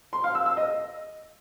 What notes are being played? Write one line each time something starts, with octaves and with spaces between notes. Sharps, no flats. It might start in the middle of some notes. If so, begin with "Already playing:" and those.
C6
F5
E6
E6
D#5